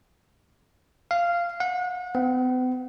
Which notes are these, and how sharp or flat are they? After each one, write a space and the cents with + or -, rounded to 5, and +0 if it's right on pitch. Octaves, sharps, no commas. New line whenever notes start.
F5 -10
F#5 -35
B3 +45